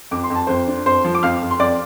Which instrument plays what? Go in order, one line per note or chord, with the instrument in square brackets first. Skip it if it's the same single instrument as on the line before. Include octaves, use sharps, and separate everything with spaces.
[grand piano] F2 D6
C6
F2
A5
F2 C5 C6
D4
F2 C5 C6
F3
D6
F2 F5 F6
F2
C6
F2 D5 D6